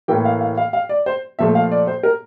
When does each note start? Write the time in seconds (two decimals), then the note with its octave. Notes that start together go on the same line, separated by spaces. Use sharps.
0.08 A2 E3 A#3 G5
0.25 F5
0.41 F5
0.57 F5
0.73 F5
0.89 D5
1.06 C5
1.39 A#2 F3 A3 E5
1.55 F5
1.72 D5
1.87 C5
2.03 A#4